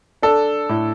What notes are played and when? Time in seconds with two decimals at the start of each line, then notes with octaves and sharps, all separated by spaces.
0.22 D4 A4
0.69 A2